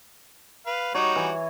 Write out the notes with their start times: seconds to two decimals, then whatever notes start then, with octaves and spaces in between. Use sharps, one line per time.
0.67 B4 F5
0.94 G3 D#4 F#4 C#5
1.16 E3